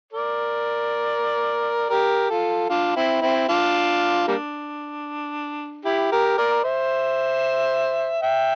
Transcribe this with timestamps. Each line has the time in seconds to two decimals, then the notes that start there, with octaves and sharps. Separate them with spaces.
0.13 A#4 D5
1.90 G4 A#4
2.29 F4 A4
2.69 D4 F4
2.96 C4 E4
3.21 C4 E4
3.49 D4 F4
4.28 G3 A#3 D4
5.85 E4 G4
6.12 G4 A#4
6.37 A#4 D5
6.64 C5 E5
8.22 E5 G5